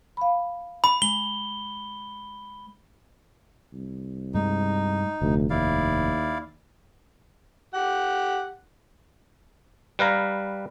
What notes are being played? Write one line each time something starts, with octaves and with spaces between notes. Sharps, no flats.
F5 B5
B5
G#3 G7
C2
G2 G#3 D#4
F1 D2
D#2 E4 D5 F5
G4 F#5
G3 B4 F5 A#5